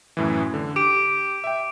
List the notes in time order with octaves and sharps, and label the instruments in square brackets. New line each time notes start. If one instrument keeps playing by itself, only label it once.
[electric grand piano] F#2 A2 E3
D3
[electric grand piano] G4 [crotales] D6 D7
[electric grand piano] E5 G5